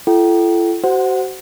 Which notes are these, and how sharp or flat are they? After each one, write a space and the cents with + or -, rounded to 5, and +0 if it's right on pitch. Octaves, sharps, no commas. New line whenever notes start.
F4 -45 A4 -20 G5 -30
F#4 +35 C5 -10 F#5 +0